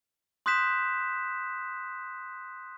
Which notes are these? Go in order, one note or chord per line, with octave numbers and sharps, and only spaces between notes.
C6 D#6 F#6 G6 B6 E7